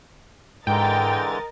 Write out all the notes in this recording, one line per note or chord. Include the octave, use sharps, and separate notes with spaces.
G#2 D3 E3 G#3 A#4 D#5 G5 A6